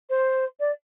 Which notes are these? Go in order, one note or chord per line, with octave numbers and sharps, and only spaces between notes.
C5
D5